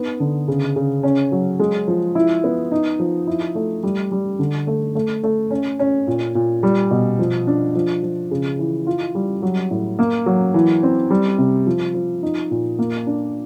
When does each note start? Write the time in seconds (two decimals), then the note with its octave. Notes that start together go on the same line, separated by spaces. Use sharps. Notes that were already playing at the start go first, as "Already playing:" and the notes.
Already playing: B3 D#4
0.20 D3
0.48 C#3
0.76 C#3
1.03 C#4
1.32 F#3
1.60 G#3
1.88 F3
2.15 E4
2.44 B3
2.71 D#4
2.99 F3
3.27 E4
3.55 A3
3.83 G3
4.12 G3
4.39 D3
4.67 A3
4.95 A3
5.24 A3
5.51 C#4
5.79 C#4
6.07 A#2
6.35 A#2
6.63 G3
6.91 B2
7.19 F3
7.47 D4
7.75 F3
8.03 F3
8.31 C#3
8.59 E3
8.87 F4
9.15 G3
9.42 F#3
9.71 A2
9.99 A#3
10.26 F#3
10.54 E3
10.83 C4
11.10 G3
11.38 C3
11.67 F3
11.94 F3
12.23 D#4
12.51 A#2
12.79 A#3
13.07 D4